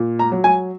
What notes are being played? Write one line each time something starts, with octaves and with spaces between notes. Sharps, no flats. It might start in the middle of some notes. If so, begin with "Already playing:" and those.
Already playing: A#2
A#5
F#3
G#5